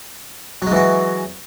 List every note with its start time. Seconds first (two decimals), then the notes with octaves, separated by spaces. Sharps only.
0.62 F#3
0.67 G#3
0.71 E3
0.76 F#4